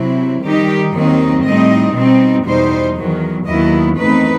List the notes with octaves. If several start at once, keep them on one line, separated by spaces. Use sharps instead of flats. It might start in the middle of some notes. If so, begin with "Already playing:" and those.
Already playing: C3 F#3 C4 E4
D#3 G3 D#4 G4
D#2 D#3 F#3 C4 D#4
A2 G3 C4 D#4 D#5
B2 G3 C4 D#4
E2 B2 G3 D#4 C5
E2 D#3 F#3
D#2 D#3 F#3 B3 E4 D#5
E2 D#3 A3 C4 D#4 B4